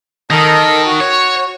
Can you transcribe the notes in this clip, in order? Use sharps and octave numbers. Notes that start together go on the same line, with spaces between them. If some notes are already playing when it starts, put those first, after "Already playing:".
D#3 A4 A#4 D#5
F#4
C#5